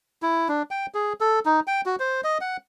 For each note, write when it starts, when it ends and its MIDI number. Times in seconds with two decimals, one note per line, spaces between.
0.22 0.48 64
0.48 0.62 62
0.71 0.86 79
0.94 1.13 68
1.21 1.39 69
1.45 1.60 63
1.67 1.81 79
1.86 1.96 66
2.00 2.21 72
2.24 2.38 75
2.41 2.57 78